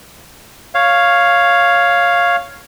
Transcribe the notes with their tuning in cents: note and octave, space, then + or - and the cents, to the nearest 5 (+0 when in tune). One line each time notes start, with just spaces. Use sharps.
C#5 +0 F5 +0